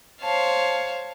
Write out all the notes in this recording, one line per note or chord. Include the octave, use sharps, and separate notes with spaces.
C5 C#5 F5 A5